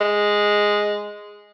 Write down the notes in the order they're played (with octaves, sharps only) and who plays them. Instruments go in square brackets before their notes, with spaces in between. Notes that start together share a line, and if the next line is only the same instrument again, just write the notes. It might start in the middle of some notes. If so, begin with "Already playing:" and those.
[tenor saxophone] G#3